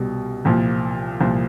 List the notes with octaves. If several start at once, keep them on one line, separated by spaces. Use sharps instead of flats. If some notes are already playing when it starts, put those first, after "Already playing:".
Already playing: C2 B2 G3
C2 A#2 F3
C2 A#2 F3